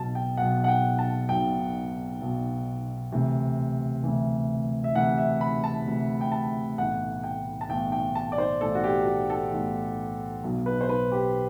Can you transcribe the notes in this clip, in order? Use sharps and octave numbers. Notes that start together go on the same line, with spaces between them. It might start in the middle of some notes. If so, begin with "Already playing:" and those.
Already playing: B1 B2 F#3 A5
G5
B1 B2 F#3 F#5
F#5
G5
A5
B1 B2 F#3 G5
B1 B2 F#3
D2 C3 E3
D2 C3 E3
E5
D2 C3 E3 F#5
E5
B5
A5
D2 C3 E3
G5
A5
B1 A2 E3 F#5
G5
A5
B1 A2 E3 G5
G5
A5
D5
C5
B1 A2 E3 A4
F#4
G4
F#4
A4
B1 A2 E3
B1 B2 F#3
B4
C5
B4
G4